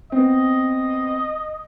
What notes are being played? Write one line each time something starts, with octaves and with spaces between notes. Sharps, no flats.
B3 C4 D#5